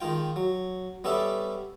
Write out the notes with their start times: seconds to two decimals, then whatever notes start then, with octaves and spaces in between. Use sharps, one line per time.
0.01 D#3 G#3 F4 G5
0.36 F#3
1.04 G3 B3 C#4 A4 D5 E5